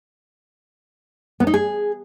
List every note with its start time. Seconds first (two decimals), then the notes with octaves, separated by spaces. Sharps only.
1.40 B3
1.47 D#4
1.54 G#4